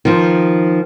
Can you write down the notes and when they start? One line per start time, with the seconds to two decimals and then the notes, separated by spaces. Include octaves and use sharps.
0.05 D#3 F3